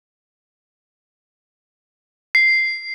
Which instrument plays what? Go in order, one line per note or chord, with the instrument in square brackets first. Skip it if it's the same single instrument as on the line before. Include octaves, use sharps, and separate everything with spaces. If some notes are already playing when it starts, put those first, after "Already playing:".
[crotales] C7